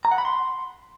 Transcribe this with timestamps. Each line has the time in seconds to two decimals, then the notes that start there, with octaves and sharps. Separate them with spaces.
0.05 A#5
0.11 F#5
0.18 B5
0.25 C6